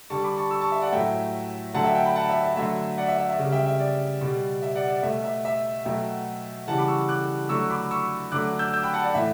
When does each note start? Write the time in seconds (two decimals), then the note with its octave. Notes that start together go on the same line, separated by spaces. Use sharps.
0.10 D3 G3 A5 C#6
0.24 B5 D6
0.37 A5 C#6
0.51 C#6 E6
0.61 A5 C#6
0.72 E5
0.82 D5 F#5
0.92 A2 F#3 A3 E5 G5
1.74 D3 F#3 A3 F#5 A5
1.85 E5 G5
1.95 E5 G5
2.05 G5 B5
2.16 F#5 A5
2.30 E5
2.43 E5
2.56 D3 F#3 A3 E5
2.98 D5 F#5
3.08 E5
3.18 E5
3.29 E5
3.39 C#3 G3
3.52 E5 G5
3.66 E5
3.80 D5
4.21 B2 G3
4.62 E5
4.75 D5 F#5
4.89 D5
5.03 B2 A3 E5
5.24 E5
5.45 E5
5.85 B2 F#3 A3 E5 G5
6.67 C#3 E3 G3 F#5 A5
6.78 B5 D6
6.88 C#6 E6
7.08 D6 F#6
7.49 D3 F#3 A3 C#6 E6
7.70 B5 D6
7.91 C#6 E6
8.32 D3 F#3 A3 D6 F#6
8.59 E6 G6
8.73 E6 G6
8.83 G5 B5
8.94 F#5 A5
9.04 D5 F#5
9.14 A2 E3 A3 E5